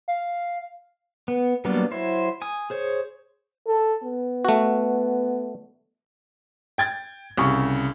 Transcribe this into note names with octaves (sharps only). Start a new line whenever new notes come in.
F5
B3
F#3 G3 A#3 B3 D4
F#3 E4 C5
G#5 D#6
G#4 C5 C#5
A4
B3
A3 F#4
G5 G#6 A6
C2 C#3 C#6